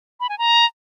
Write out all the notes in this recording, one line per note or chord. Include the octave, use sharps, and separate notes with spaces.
B5
G#5
A#5